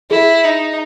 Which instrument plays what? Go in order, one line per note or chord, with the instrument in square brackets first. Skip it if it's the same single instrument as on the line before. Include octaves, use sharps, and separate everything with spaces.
[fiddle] E4 [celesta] G#4
[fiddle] D#4